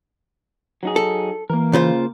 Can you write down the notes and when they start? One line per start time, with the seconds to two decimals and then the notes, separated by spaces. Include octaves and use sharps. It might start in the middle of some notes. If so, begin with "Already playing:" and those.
0.83 F#3 D#4 G#4
0.96 A4
1.50 E3 A#3 A#4
1.73 C#3 F4 C5